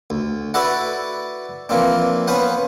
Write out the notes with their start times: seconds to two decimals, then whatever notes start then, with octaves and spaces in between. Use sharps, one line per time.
0.10 D2
0.54 E4 F#4 A4 B4 D5 F#5
1.69 E3 F3 A#3 C4 D4
2.28 B3 C#4 B4 C5 F#5